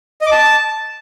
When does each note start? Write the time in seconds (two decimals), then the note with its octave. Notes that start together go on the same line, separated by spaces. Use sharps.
0.21 D#5
0.26 D6
0.31 A5